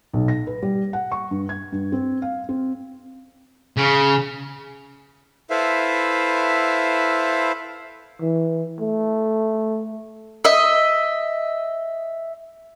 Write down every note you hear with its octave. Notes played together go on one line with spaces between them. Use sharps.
B1
A#6
B4
G3
F#5
C#6
G2
G#6
G2
C4
F5
C4
C#3
E4 A4 B4 C5 E5 F5
E3
A3
D#5 E5